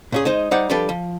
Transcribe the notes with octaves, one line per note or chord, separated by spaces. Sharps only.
A#2 C#4 G#4
G#3 D#4 C5
G3 D#4 C5 D5 F#5
F3 G3 D4 G4 A4 B4
F3